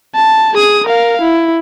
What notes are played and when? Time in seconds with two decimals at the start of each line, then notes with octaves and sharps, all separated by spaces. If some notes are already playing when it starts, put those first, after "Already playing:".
0.15 A5
0.54 G#4 D#6
0.86 A#4 F5
1.21 E4